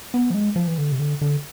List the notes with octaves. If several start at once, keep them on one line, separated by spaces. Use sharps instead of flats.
B3
F3
G#3
F3
E3
D3
C3
D3
D3